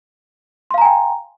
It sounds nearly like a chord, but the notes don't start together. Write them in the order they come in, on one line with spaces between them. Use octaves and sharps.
C6 F5 A#5 G#5 G5